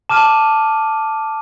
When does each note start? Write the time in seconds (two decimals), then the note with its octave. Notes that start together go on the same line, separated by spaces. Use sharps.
0.10 A5 D6 F6 D#7